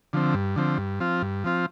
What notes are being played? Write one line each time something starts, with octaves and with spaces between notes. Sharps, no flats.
D3 F3 C4
G2
D3 F3 C4
G2
F3 C4 F4
G2
F3 C4 F4